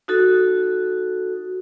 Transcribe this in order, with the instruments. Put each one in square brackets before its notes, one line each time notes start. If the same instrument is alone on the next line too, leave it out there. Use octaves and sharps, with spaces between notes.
[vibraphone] D#4 F#4 A4